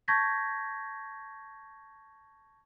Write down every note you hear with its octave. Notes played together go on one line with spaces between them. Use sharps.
A5 C#6 G6 G#6 A#6 B6